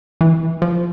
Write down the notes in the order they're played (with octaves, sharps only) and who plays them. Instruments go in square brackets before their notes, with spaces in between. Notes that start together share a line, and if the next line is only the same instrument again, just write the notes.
[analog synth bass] E3
F3